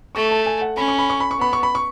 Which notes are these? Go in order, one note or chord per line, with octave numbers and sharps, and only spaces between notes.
A3 C#6
A5
G#5
F#5
C#4 B5
C#6
B5
C#6
B5
C#6
B3 B5
C#6
B5
C#6